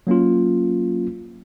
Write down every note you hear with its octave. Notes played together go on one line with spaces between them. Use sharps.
F#3 A#3 C#4 F4